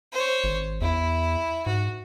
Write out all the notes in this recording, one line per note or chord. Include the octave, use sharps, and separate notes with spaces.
C5 C#5
G#1
E2 E4
G#2 F#4